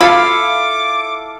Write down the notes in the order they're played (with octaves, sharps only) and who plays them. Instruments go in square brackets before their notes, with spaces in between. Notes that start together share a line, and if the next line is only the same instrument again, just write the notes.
[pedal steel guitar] E4 A4 F5 [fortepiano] F4 [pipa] B5 [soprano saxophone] D6